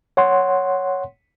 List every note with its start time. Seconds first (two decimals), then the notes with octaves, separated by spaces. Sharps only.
0.17 C#5 F#5 C6